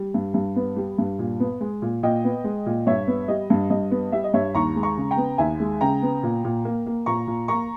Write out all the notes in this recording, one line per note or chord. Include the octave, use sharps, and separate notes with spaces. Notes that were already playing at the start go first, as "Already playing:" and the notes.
Already playing: G3
G2
G2
B3
G3
G2
A#2
B3
G#3
A#2
A#2 D#5 G5
B3
G#3
A#2
G2 C#5 E5
B3
G3 D#5
G2
G2 D#5
B3
G3 E5
D#5
G2 C#5 E5
D#2 A#5 C#6
G#3
A#5 C#6
C#3
G5 A#5
B3
D#2 E5 G#5
G#3
C#3 G5 A#5
B3
A#2
A#2
A#3
A#3
A#2 A#5 C#6
A#2
A#3 A#5 C#6